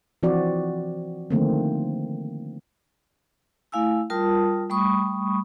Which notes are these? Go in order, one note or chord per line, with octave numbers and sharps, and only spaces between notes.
E3 F3 C4 F#4 D5
D3 D#3 F3 A3 A#3 C4
A3 E4 F5 G#5 E6
G3 F4 A#4 A5 D#6
G3 A3 B5 C#6 D#6